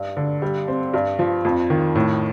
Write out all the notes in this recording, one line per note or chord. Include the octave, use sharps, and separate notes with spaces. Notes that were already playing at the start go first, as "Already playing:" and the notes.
Already playing: G2
D3
G3
C4
G2
F3
F2
D#3
A2